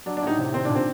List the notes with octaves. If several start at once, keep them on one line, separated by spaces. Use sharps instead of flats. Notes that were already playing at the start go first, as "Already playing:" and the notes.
F#3 D4
D4
A2 D#4
C3
D#3 C4
A#2 D4
C4